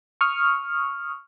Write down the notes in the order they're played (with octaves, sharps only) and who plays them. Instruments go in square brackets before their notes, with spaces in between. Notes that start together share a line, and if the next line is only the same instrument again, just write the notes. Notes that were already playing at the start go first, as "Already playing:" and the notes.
[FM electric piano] C#6 D#6 F6